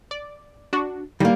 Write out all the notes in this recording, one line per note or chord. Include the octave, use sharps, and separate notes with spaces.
D5
D4 F#4
A2 D#3 G3 A#3